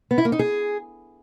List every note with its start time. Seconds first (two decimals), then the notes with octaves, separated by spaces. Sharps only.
0.11 B3
0.18 E4
0.25 A#3
0.32 D#4
0.39 G#4